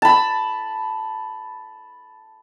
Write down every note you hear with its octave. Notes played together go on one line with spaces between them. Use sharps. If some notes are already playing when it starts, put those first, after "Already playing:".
A5 B5